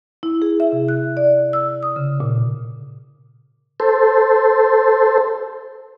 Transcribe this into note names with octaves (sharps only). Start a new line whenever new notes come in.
E4
G#4
E5
C3
F#6
D5
E6
D#6
C#3
A#2
A4 C5